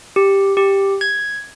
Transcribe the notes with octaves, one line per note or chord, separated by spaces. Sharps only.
G4
G4
G#6